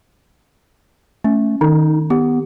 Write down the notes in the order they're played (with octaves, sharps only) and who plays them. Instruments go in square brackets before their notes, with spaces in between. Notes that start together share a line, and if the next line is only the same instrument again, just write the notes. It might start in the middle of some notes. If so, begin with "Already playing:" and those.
[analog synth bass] A3 [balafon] C#4
[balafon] D#3 [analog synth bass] D#4
[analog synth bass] B3 [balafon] G4